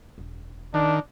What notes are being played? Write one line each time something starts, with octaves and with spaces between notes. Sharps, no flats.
E1
D#3 D4